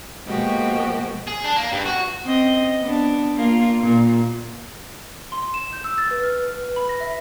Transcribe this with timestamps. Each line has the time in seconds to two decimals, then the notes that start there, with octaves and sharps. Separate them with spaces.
0.25 B2 F3 G#3 A#3 F#4 G4
1.28 G#4
1.44 D4
1.56 A#3
1.72 G2
1.86 F#4
2.23 C4 C#4 D#5
2.82 B3 D4
3.37 A#3 F4
3.81 A#2
5.32 C6
5.54 E7
5.73 G6
5.84 E6
5.98 A6
6.11 B4
6.24 F6
6.50 B4
6.64 B4
6.76 B5
6.89 A#6
7.01 E5